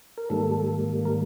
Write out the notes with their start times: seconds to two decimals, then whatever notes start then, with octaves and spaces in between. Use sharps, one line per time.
0.18 A#4
0.30 G#2 D#3 G3 A#3 A4
1.05 A#4